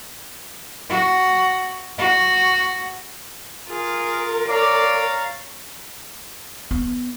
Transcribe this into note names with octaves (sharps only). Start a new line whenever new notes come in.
F#4
F#4
F4 G#4 A#4
C#5 D5 F5 A#5 A6
B3